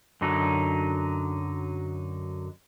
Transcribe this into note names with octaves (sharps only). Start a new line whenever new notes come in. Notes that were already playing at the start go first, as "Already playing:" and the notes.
F#2 D3 F#3 D#4